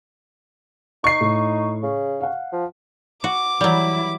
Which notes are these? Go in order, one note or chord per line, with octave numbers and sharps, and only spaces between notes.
D#4 C#6 C7
A2
C#3
F5 F#5
F3
F#4 D6
E3 F#3 G3 E4